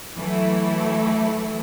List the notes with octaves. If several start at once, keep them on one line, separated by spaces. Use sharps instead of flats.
E3 F#3 A3 E4